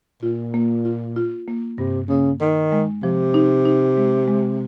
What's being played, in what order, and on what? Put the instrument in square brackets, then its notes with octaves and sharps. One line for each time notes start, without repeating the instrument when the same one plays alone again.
[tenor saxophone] A#2 [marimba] F4
[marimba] A#3
F4
F4
A#3
[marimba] G2 [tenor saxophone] C3
[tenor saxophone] C#3 [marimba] A#3
[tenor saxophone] D#3 [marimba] D#4
[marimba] G#3
[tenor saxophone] C3 [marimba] F3
[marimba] D#4
D#4
G#3
G#3